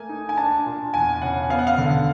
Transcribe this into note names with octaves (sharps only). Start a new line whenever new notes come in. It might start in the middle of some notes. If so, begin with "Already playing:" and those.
Already playing: A3 A#3 G#5
D#4
G#5
D4 A5
A#2
E2 G#5
C#3 F#5
B3 F5
F#5
F5
D3